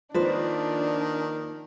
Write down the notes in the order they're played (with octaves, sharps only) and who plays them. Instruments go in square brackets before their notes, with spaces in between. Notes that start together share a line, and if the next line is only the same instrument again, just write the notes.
[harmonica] D#3 [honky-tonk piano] F3 [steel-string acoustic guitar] A#3 B4 C5 [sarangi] D4